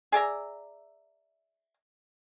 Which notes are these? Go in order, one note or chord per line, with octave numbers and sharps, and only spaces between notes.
G#4 D5 E5 A#5